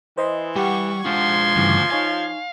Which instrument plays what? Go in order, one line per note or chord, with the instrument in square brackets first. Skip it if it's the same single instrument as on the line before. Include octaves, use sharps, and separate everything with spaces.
[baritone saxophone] E3 [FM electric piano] C5 D#5 C6
[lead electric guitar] G3 [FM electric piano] G4 F#5 [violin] C#6
[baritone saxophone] F3 [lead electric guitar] G#3 D4 [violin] C6 G#6
[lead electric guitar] D2 [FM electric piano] G2 C#3 E3
[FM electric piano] D#4 C#5 G#5 [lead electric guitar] F5